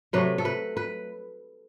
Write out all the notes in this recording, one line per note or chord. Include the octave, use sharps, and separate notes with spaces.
C3 F#3 A3 B4
A4
B4
B4